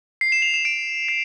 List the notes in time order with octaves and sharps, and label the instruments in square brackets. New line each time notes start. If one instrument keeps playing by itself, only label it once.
[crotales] C7
E7
F7
E7
D7
C7